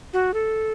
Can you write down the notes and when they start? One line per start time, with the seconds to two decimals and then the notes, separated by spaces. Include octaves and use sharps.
0.13 F#4
0.34 A4